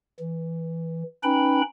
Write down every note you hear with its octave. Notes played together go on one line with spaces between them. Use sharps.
E3
C#4 D#4 B4 G5 B5